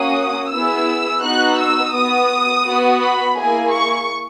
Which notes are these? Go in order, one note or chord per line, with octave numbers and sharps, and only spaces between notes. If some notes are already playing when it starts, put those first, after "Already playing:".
Already playing: A#3 C#4 F#4 D#6
B3 E4 G#4 E6
B3 D#4 F#4 F#6
E6
B3 F#4 D#6
B3 F#4
B5
A#3 E4 G#4 G#5
C#6